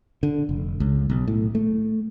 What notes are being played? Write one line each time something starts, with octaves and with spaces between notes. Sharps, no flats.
D3
F1
C#2
B1
A2
A3